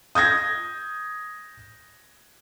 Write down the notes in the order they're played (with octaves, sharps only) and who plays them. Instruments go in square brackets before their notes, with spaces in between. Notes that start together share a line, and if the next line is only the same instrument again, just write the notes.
[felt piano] D#6 G6 G#6 A#6